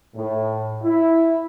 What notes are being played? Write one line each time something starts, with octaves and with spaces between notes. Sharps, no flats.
A2
E4